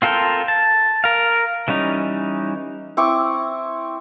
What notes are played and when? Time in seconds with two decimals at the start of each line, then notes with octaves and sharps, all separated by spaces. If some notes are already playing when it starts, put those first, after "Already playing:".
0.02 C4 F4 A4 A#4 G5
0.48 A5
1.04 A#4 F5
1.68 E3 G3 C#4 D#4
2.97 C4 E4 C#6 D6